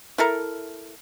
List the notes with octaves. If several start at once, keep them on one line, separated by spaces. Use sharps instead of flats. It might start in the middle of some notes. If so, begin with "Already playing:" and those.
E4 A4 A#4